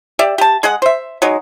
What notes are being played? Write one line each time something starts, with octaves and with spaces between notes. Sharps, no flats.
G4 D5 E5
G4 A5
G#3 G#4 D#5 F#5
C5 E5
F#3 G#3 D#4